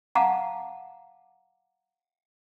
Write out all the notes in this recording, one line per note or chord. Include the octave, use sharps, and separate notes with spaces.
F5 F#5 A5 A#5 D6